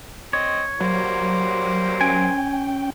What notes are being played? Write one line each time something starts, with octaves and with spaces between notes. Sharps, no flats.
C4 C#5 D#5
F#3 G3 A#3 C5
C#4 G5 G#5